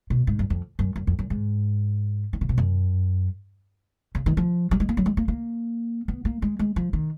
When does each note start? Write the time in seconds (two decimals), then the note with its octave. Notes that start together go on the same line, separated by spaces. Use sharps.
0.10 B2
0.27 G#2
0.39 F#2
0.50 F2
0.79 F#2
0.96 F#2
1.07 F2
1.19 F#2
1.30 G#2
2.33 D#3
2.41 C#3
2.49 B2
2.58 F#2
4.15 C#3
4.26 D#3
4.37 F3
4.71 F#3
4.80 G#3
4.89 A#3
4.97 F#3
5.06 G#3
5.17 A#3
5.28 A#3
6.08 B3
6.25 A#3
6.42 G#3
6.59 G#3
6.76 F3
6.93 D#3